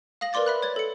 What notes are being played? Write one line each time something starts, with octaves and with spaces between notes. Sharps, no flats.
F5 D#6 A#6 F#7
A#4 B4 D5 C6 D6 A6
E5 B5 F#6
C#5 G#6 A6
A4 C#7